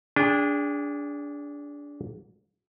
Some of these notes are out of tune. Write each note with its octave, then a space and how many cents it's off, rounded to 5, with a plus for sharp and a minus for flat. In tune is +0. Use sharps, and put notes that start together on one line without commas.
D4 -20 G#4 -15 G5 +30